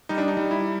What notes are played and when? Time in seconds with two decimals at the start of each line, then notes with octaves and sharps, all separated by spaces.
0.09 G3 D#4
0.18 D4
0.28 D#4
0.37 G3
0.51 E4